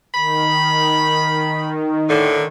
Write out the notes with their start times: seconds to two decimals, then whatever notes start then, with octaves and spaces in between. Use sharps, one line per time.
0.14 D#3 B5
2.08 A2 D3